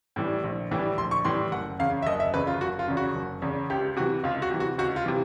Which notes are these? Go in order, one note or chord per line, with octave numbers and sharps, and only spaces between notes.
A2 E3 G3
A#1
A2 E3 G3
A#1 C6
C#6
A2 E3 G3 C6
F#1 F#5
E2 C#3 F5
E5
F#1 D#5
E5
E2 C#3 B4
F4
F#1 F#4
F4
E2 C#3
F#4
F#1
E2 C#3
C#2 G4
C3 E3 F#4
C#2 F4
F#4
C3 E3
F#4
C#2 F#4
F4
C3 E3